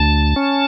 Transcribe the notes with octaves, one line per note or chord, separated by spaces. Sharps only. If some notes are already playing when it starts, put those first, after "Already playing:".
Already playing: D2 A5
C#4